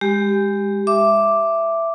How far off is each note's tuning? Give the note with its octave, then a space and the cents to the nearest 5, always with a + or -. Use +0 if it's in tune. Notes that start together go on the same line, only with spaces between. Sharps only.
G#3 -25 G4 +0
E5 +10 D6 +0